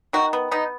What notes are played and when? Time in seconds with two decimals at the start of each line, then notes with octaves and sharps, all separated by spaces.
0.13 D#3 F#4
0.33 B3
0.51 B3 D#4